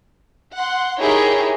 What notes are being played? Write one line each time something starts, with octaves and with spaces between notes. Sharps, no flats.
F#5 C6
D#4 E4 G4 G#4 A#4 C#5